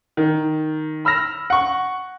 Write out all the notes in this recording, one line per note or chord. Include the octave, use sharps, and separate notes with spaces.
D#3
B5 E6 F6 A#6
F#5 C#6